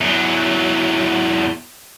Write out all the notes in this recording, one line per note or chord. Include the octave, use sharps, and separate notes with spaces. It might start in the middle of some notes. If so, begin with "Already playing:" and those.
E2 F#3